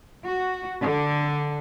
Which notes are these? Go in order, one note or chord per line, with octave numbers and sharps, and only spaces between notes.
F#4
D3